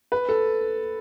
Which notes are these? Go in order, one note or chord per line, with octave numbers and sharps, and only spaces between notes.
B4
A4